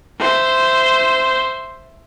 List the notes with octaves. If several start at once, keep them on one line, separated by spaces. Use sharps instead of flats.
C5 E5